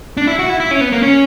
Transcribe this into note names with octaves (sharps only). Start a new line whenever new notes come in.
D4
E4
F#4
E4
E4
C#4
B3
A#3
C#4